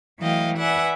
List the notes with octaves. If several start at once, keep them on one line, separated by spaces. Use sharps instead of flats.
E3 F#3 A3 D#5 F5 G5
B4 D5 E5 F#5 G#5